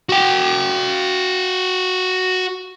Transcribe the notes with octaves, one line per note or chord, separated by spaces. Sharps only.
F#4 G5